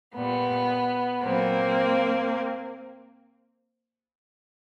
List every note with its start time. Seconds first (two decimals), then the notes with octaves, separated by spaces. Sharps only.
0.14 A#2 G3 B3
1.23 A#2 F#3 A#3 C4